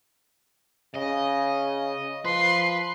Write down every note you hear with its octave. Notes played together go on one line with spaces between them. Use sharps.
C#3 D#5
F3 B4 C6